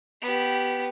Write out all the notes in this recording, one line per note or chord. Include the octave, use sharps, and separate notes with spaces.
B3 G4